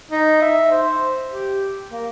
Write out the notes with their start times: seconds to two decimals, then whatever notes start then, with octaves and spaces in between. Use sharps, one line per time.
0.12 D#4
0.42 E5
0.71 C5
1.29 G4
1.91 A#3